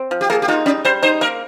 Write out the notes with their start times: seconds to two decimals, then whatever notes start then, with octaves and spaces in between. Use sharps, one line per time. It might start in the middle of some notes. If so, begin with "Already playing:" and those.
Already playing: C4
0.11 F3
0.21 G4
0.30 A#3 G#4
0.42 G4
0.48 D#4 F4
0.66 G3 C#4
0.85 G3 C5
1.03 D#4 C5
1.21 A#3 A#4